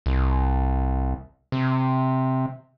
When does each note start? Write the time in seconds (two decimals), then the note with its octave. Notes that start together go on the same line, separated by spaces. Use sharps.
0.06 C2
1.52 C3